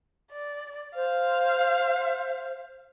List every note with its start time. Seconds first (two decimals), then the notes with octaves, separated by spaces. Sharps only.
0.31 D5
0.96 C5 F5